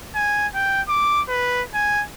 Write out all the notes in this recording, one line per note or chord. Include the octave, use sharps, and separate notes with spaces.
G#5
G5
D6
B4
G#5